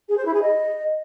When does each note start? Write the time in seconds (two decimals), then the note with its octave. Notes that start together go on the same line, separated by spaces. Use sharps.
0.08 G#4
0.17 C5
0.25 E4
0.33 G#4
0.41 D#5